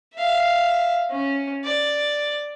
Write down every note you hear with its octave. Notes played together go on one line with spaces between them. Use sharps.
E5 F5
C#4
D5